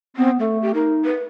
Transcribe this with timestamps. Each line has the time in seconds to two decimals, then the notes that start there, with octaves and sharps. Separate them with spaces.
0.16 B3 C4
0.40 A3 A4
0.62 G4
0.75 D#4 A#4
1.05 B4